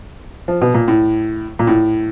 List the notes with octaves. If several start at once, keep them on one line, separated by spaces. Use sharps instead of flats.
F3
B2
A#2
A2
A#2
A2